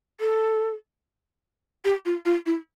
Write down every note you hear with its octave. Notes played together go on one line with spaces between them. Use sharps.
A4
G4
F4
F4
E4